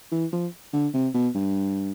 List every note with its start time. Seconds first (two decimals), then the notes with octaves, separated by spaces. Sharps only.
0.12 E3
0.33 F3
0.73 D3
0.94 C3
1.15 B2
1.35 G2